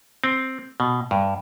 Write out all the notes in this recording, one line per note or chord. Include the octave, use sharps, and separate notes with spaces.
C4
B2
G2